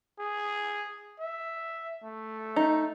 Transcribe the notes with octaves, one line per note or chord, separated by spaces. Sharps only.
G#4
E5
A3
D#4